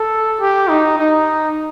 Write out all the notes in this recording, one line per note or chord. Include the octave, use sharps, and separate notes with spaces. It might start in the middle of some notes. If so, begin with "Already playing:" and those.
Already playing: A4
G4
D#4
D#4